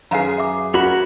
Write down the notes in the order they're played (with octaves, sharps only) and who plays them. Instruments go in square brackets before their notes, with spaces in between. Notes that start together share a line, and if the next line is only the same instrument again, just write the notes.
[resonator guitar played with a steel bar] F#2 G#4 [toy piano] B4 F5 A#5
[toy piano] E5 D6
[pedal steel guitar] C#4 A#4 B5 [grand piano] F#4